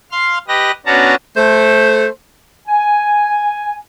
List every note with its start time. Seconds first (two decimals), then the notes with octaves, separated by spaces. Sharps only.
0.11 F5 C6 F6
0.48 G4 B4 D#5 A#6
0.86 B3 C#4 D4 F#4 A5 A#5
1.36 A3 C5
2.68 G#5